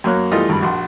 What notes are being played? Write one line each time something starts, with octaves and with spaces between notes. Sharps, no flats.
F#2 A#3 F#4 C#5 F#6
E3 G3 A3 F4 A4 D#5
G#1 G2 B5
A#1 F#4 C6